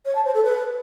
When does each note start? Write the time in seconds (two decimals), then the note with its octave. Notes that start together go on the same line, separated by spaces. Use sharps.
0.05 C#5
0.15 A5
0.24 C5
0.34 A4
0.44 B4